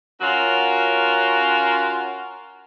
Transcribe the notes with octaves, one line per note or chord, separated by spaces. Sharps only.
C#4 F4 F#4 A#4